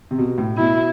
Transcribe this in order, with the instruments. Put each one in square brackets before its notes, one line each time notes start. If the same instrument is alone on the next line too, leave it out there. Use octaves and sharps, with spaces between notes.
[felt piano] C3
B2
A2
[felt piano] B2 [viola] E4